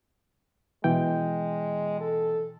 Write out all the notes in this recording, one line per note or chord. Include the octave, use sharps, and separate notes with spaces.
B2 E3 G#3 G5
A4